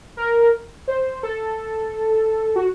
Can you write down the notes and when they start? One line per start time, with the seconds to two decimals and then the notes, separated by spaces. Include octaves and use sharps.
0.17 A#4
0.88 C5
1.23 A4
2.56 F#4